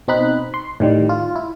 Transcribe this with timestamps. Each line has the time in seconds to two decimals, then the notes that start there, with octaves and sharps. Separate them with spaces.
0.08 B2 C4 D#4 B5 F#6
0.54 C6
0.80 A2 D#3 G3
1.09 F4
1.36 E4